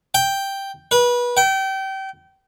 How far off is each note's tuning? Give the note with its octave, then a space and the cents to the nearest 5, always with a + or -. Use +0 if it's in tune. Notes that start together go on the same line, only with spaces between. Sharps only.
G5 +0
B4 -25
G5 -30